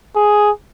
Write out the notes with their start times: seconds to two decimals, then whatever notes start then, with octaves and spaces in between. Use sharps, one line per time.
0.16 G#4